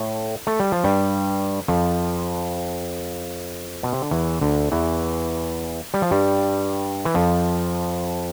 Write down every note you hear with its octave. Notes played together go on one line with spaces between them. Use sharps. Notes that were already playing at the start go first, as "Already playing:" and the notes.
Already playing: A2 A3
A3
G3
F3
G2 G3
F2 F3
B2
C3
D3
E2 E3
D2 D3
E2 E3
G3
F3
G2 G3
E3
F2 F3